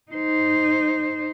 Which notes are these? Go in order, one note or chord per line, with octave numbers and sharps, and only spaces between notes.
D#4 C5